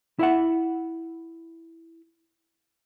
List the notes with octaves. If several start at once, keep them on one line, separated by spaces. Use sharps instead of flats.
E4 E5 F#5